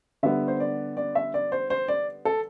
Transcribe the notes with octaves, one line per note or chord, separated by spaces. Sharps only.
D3 G3 B3 E5
C5
D5
D5
E5
D5
C5
C5
D5
A4